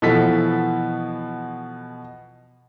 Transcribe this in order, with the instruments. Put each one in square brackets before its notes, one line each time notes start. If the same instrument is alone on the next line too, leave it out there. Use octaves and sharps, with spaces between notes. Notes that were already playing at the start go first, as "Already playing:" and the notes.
[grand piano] B2 E3 F3 A4 B6